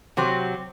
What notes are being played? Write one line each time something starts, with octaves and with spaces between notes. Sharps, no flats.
C3 F#3 C4